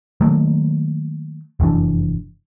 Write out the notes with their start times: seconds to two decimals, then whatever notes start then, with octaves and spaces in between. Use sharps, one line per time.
0.21 D#3 F#3 A3 A#3
1.60 F1 F#2 E3 D4